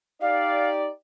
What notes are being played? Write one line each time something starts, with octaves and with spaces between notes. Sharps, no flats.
D#4 G4 D5 F5